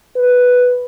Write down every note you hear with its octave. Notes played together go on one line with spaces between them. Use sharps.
B4